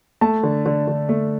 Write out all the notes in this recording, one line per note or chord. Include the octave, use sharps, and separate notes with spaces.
A3 A5
D3
D3
D3
A3